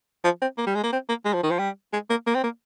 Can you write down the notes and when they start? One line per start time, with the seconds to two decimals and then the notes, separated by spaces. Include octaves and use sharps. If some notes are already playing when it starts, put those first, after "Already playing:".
0.24 F3
0.42 C4
0.58 A#3
0.67 G3
0.75 G#3
0.84 A#3
0.93 C4
1.09 A#3
1.25 G#3
1.34 F3
1.43 D#3
1.52 F3
1.59 G3
1.93 G#3
2.10 A#3
2.27 A#3
2.35 C4
2.44 A#3